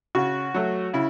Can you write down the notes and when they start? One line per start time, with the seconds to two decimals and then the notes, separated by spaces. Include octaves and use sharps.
0.15 C#3 F#4
0.54 F#3 A3
0.93 C#3 E4